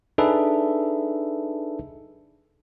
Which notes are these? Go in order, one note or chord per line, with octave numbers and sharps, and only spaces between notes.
D4 D#4 G#4 A4 B4 E5